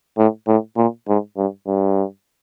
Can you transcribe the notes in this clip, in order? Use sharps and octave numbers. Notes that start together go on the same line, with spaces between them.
A2
A2
A#2
G#2
G2
G2